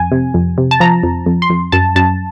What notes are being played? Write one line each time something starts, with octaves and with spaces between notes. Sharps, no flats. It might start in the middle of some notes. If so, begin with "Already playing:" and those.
Already playing: F2 G#5
C3
F2
C3
A5
F3 A#5
F2
F2
C6
F2
F#2 A5
F#2 A5